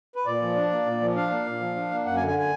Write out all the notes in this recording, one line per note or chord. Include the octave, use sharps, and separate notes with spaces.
B4
A#2 D5
F3
D4
A#3
A#2
F3
D4 F5
A#3
A#2
F3
D4
A#3
F#2 F#5
G#5
D3
G#5
G#5